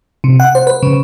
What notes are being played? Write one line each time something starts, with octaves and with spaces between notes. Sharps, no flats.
C3
F#5
C5
B4
C#3